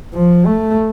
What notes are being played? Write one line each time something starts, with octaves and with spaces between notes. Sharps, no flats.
F3
A3